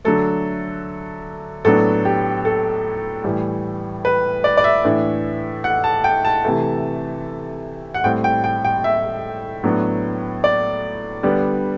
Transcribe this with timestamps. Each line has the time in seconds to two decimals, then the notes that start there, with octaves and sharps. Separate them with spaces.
0.05 D3 F#3 A3 A4
1.65 A2 F#3 B3 D4 A4
2.05 G4
2.45 A4
3.24 A2 E3 G3
4.05 B4
4.44 D5
4.57 D5
4.64 E5
4.84 A2 E3 A3 D4
5.64 F#5
5.84 A5
6.04 G5
6.25 A5
6.44 C3 E3 A3
7.94 F#5
8.04 A2 G3 C4 G5
8.24 G5
8.44 G5
8.64 G5
8.84 E5
9.63 A2 F#3 B3 D4
10.44 D5
11.23 D3 G3 B3 D4